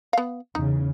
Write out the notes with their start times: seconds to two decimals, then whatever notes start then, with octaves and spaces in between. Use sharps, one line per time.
0.13 B3 F5
0.55 E2 C#3 D#4